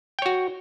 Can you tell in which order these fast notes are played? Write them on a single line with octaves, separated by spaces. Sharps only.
G5 C#5 F#4